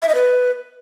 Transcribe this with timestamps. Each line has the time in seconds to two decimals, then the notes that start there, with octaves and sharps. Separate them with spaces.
0.02 E5
0.09 D#5
0.15 B4